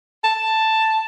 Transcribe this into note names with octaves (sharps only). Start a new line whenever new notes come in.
A5